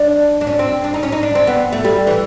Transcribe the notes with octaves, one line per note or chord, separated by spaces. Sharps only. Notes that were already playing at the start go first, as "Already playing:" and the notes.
Already playing: D4
D4
C#4
C4
D4
D#4
C#4
D#4
D4
C4
B3
A3
G3
E3